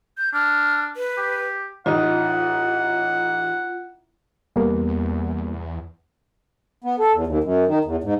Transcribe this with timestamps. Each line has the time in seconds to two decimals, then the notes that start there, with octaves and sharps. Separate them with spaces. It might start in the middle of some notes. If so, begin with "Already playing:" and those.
0.18 G6
0.33 D4 F6
0.96 B4
1.18 G4
1.86 A1 D#4 F4 F#5
4.56 E2 G3 A#3 B3
6.84 B3
6.99 A4
7.14 E2
7.27 D#2
7.44 F#2
7.67 D#3
7.84 E2
8.04 G#2